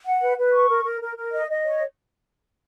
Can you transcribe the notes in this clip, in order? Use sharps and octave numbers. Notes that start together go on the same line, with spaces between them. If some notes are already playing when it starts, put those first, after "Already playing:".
F#5
B4
B4
C#6
A#4
A#4
A#4
A#4
D#5
D#5
C#5